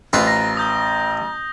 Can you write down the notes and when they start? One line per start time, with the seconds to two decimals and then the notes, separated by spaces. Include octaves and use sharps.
0.13 A1 F4 B4 C5
0.27 A#5 A#6
0.57 A#5 D#6 G6 G7